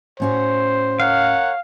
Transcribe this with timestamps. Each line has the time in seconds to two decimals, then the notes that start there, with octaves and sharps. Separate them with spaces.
0.20 A2 C#4 F#4 C5
1.00 A#4 C#5 F5 F#5